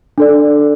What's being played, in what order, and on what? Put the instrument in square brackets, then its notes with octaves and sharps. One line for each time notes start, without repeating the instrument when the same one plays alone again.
[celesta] D4 A4 D5